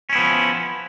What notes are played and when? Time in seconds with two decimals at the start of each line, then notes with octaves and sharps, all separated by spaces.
0.10 C#4
0.12 E4
0.15 B3
0.18 F3